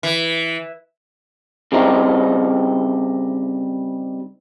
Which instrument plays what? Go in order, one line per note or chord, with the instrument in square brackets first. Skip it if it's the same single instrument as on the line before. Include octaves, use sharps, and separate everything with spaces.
[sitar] E3
[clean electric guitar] C#3 G3 C4 D#4